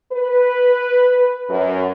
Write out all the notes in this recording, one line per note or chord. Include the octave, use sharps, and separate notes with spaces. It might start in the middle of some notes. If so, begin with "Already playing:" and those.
B4
F#2